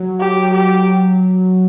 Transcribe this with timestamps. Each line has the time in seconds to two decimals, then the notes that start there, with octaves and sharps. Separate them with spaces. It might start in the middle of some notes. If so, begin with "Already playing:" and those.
Already playing: F#3
0.20 G4
0.54 G4